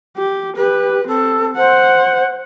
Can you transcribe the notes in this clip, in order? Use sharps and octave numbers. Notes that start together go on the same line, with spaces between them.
G4
G4 B4
C4 A4
C5 F#5